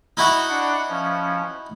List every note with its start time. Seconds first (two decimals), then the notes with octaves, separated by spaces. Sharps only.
0.17 D#4 E4 F#4
0.49 D4 F#5
0.89 F3 C#4